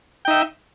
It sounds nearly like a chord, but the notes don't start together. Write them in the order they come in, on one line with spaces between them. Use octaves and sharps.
G5 D#4 E5